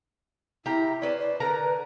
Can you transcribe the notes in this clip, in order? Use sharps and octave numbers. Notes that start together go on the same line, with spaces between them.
E4 G4 F5 A#5
C#4 B4 C5 D5
D5
D3 A#4 B4 A#5